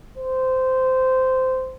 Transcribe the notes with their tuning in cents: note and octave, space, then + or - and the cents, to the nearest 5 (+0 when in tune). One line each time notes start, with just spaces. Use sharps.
C5 -15